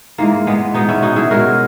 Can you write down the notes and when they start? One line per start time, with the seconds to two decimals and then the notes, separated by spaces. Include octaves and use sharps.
0.18 G#2 E3 G#3 A#3
0.47 G#3 B3
0.74 B2 G#3 B3 D#4
0.88 C#4 E4
1.02 D#4 F#4
1.16 E4 G#4
1.30 B2 G#3 F#4 A#4